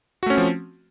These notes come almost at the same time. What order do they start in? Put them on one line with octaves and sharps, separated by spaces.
F#4 A3 C#4 C4 F3